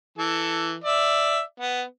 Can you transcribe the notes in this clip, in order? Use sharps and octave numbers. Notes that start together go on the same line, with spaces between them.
E3 A4
D5 E5
B3